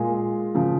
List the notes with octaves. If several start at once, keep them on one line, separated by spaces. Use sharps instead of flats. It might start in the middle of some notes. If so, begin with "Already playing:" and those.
Already playing: A#2 G#3 F4 G#4
C#3 F3